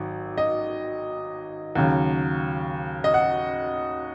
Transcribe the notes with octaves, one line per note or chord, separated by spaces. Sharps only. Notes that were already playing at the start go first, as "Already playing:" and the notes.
Already playing: G#1 D#3 F#3
D#5
D#2 C#3 F#3
D#5
F#5